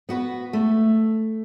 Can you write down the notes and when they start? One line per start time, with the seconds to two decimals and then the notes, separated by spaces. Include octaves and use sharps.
0.09 B3 F#4 B4
0.53 A3